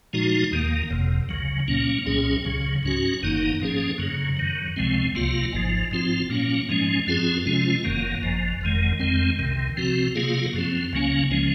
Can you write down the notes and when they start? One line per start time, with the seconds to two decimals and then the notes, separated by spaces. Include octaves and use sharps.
0.13 A#2 F3 G#3 D#4 F#4
0.52 D#2 D#3 A#3
0.91 F#1 F2 C3
1.29 C#2 C#3 F#3
1.68 A#2 F#3 A#3 C#4
2.06 C2 A#2 F#3 C#4 G#4
2.45 C#2 C#3 F#3
2.83 G#2 F#3 C#4 F#4
3.22 F#1 F#2 D#3 A#3 D#4
3.60 G#2 F3 A#3 C#4 G#4
3.98 F#2 C#3 F#3
4.37 F#2 D#3 F#3
4.76 C#2 C3 F3 G#3 C4
5.15 C2 C3 F#3 A#3 F4
5.53 G#1 G#2 F3
5.91 G#2 F3 C4 F4
6.30 A#2 F#3 A#3 C#4
6.69 G#2 F3 G#3 C#4
7.07 F#2 F3 C4 F4 G#4
7.45 C3 F3 G#3 C#4 F4
7.84 F#1 F#2 D#3 A#3
8.22 G#1 F#2 F3
8.61 F#1 F2 D#3 G#3
9.00 F2 D#3 G#3 C4
9.39 C2 C3 D#3
9.77 C3 F3 C4 F#4
10.15 C3 F#3 A#3 F4 G#4
10.53 F#2 F3 C4
10.93 C#2 C#3 F#3 A#3 C#4
11.31 C#3 F3 G#3 C#4